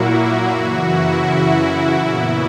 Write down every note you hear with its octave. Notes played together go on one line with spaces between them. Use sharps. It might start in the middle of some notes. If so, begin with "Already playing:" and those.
Already playing: A#2 F#3 A#3 E4 F#4
F#2 C#3 E3 F#4
E4
E4
A#2 F#3 B3